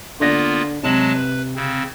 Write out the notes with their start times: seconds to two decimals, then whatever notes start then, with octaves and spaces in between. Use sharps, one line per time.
0.20 D3 A#3 B3 D4 F4 A#6
0.83 C3 F#3 G#3 A5 E7 F#7
1.13 B4
1.56 C#3 C4